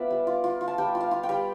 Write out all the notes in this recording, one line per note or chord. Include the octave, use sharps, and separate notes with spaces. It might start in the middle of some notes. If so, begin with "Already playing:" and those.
Already playing: B3 F4 D5 E5
G3
F4
F4
F4
A5
G3 G5
F4
F5
F4
G5
G3